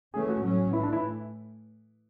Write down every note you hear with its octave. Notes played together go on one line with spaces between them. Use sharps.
E3 A3 C#4 G#4
F#4
A2 F#3 C#4
A2 E3 A3 E4
D4
E4